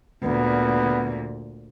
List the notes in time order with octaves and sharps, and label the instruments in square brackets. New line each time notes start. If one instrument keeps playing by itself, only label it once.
[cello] D2 A#2 [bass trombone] B3